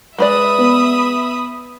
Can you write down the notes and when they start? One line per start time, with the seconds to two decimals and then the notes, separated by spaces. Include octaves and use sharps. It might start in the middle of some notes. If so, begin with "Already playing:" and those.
0.19 G#3 B4 D5 E5 B5 D#6
0.58 B3